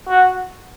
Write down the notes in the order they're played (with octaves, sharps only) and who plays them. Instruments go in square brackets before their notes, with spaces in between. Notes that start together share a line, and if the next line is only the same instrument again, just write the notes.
[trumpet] F#4